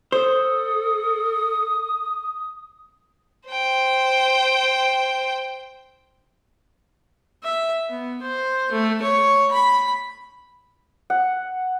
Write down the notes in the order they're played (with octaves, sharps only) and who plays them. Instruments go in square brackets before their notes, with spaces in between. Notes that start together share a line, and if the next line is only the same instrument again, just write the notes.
[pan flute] A4 [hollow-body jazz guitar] C5 [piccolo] D#6
[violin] C5 G5
[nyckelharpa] E5
B3
C5
A3
C#5
B5
[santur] F#5